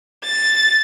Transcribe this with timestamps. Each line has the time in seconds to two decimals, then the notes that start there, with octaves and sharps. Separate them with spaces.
0.23 A6